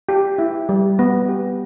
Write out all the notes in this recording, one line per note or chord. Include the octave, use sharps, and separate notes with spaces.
G4
E4
G3
B3
G4